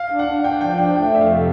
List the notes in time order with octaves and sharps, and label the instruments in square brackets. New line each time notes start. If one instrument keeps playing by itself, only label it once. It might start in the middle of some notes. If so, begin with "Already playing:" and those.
Already playing: [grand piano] F5
[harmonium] D4
[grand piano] F#5
[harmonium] D4
[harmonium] D4 [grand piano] G5
[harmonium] F3 [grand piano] G5
[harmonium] D4 [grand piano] G5
[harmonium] A3 [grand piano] G5
[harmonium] F2 [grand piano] E5
[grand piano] F5
[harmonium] C3